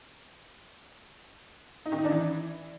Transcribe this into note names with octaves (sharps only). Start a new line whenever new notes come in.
D#4
D#3
D#4
D4
E3